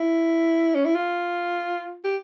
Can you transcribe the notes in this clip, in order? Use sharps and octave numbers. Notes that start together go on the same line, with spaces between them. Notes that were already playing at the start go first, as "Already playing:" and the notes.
Already playing: E4
C#4
E4
F4
G4